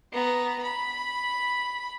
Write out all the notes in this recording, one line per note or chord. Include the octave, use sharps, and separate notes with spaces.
B3 A#5
B5